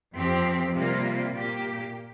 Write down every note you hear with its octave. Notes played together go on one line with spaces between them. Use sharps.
F2 F3 C4 G4
C3 G3 A#3 F4
A#2 A#3 G4